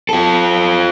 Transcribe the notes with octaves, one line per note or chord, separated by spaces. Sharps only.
F4 A4